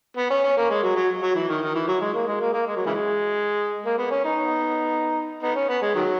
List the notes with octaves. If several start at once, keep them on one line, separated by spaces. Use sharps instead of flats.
B3
C#4
C#4
A#3
G#3
F#3
F#3
F#3
E3
D#3
D#3
E3
F#3
G#3
A#3
G#3
A#3
A#3
G#3
F#3
C#3 E3 G#3
A#3
B3
C#4
B3 D#4
B3 D#4
C#4
B3
G#3
D#3 F#3